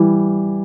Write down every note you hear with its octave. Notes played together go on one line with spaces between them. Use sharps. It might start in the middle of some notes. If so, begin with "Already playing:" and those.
Already playing: E3 G3